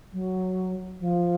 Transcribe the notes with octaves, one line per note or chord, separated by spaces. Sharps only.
F#3
F3